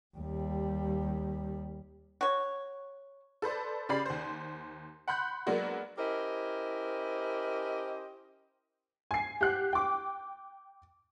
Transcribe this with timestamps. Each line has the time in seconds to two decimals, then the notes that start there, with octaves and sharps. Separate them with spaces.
0.17 D#2 G3
2.21 F#4 C#5
3.42 A4 B4 C5 D5
3.89 C#3 C#4 G4 D5 B5 C7
4.05 D#2 C5
5.08 F#5 B5 C6 F#6 G6
5.47 F#3 G#3 A#3 B3 D4 F#4
5.98 C#4 E4 G4 A#4 C5 D#5
9.11 G#5 C7
9.41 G4 F#5 F#6 C7
9.73 G5 D6